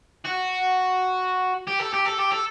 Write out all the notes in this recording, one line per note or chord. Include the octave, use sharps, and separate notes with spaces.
F#4
G4
A4
G4
A4
G4
A4